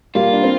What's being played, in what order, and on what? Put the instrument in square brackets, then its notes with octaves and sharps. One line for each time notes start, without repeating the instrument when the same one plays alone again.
[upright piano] G3 A#3 [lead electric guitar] F4
[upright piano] D4
C4